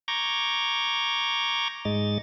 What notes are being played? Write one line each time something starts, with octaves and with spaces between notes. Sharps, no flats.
A#5 C#6 D6 G6 G#6 A#6
G#2 G#3 D#5 A6